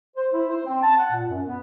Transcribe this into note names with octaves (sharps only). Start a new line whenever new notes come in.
C5
E4
C5
C4
A5
F#5
A#2
F#2
B3